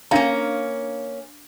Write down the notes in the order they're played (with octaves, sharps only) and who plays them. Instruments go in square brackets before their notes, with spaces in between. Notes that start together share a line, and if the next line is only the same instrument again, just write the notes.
[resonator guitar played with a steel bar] A#3 C#4 [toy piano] D4 F5 A#5